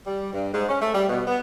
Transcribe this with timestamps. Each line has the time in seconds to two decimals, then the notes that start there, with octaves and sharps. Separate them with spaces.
0.05 G3
0.32 G2
0.52 G#2
0.68 C#4
0.80 A3
0.94 G3
1.07 B2
1.27 B3